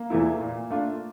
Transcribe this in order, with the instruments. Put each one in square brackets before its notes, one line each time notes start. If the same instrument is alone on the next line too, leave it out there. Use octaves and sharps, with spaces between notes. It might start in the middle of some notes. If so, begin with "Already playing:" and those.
Already playing: [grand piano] A#3
[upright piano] E2 E3 A3 E4
A#2
A3 D4 F4